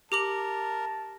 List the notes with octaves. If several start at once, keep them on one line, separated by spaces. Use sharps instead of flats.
G4 A#4 A5 D6 F#7